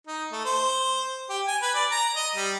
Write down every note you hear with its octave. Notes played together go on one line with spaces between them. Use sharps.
D#4
A3
C5
G4
G#5
B4
D5
A#5
D#5
G3